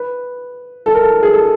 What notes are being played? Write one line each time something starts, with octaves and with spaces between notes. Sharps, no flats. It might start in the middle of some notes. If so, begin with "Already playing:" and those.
Already playing: B4
A4
A#4
A4
G#4
A4